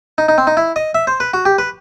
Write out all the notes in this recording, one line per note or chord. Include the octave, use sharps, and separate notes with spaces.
D#4
D#4
C4
D#4
E4
D#5
E5
C5
B4
F#4
G4
B4